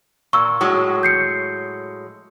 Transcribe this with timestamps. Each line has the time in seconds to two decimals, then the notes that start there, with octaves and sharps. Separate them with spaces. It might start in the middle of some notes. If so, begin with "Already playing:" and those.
0.33 A#2 C#6 E6
0.61 A2 F#3 G#3
1.03 G6 C7 C#7